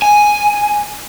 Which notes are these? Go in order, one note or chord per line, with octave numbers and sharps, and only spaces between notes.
G#5